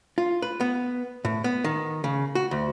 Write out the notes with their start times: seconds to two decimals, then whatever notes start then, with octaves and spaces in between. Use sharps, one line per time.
0.18 F4
0.42 B4
0.60 B3
1.25 A2
1.44 B3
1.64 D#3
2.04 C#3
2.35 F#4
2.51 D2